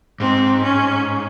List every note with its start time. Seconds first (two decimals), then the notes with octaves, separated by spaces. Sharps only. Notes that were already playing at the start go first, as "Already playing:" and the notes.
0.20 G#2 C4
0.63 C#4